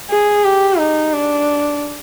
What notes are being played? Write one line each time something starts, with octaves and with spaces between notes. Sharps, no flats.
G#4
G4
D#4
D4